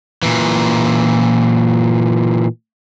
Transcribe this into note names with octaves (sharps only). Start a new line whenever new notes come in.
A#2 E3